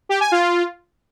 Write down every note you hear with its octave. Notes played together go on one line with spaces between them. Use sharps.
G4
G#5
F4